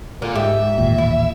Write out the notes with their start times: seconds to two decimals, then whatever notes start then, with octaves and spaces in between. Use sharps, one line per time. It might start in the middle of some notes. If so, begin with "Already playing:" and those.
0.22 D3 F4 A#4
0.35 G#2 G4 E5
0.78 A1 D#2 A#2
0.98 E4